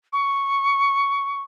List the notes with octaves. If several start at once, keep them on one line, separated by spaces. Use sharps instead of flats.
C#6